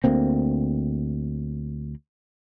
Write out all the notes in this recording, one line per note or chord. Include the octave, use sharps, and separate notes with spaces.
D2 A#3 C4